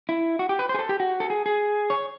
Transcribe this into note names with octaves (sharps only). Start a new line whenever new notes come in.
E4
F#4
G4
B4
C5
G#4
A4
G4
F#4
A4
G#4
G#4
C#5